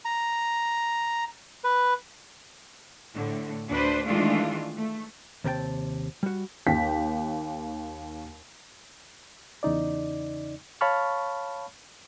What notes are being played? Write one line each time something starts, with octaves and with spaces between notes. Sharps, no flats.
A#5
B4
A2 D3
D2 D4 B4 C5
D#3 E3 G#3 A3 D4 F4
A3
D#2 C3 A#4 G5 A5
G3 F#4
D#2 G5 B6
E2 C#3 D#4 D5
C#5 F5 A5 B5 C#6 F6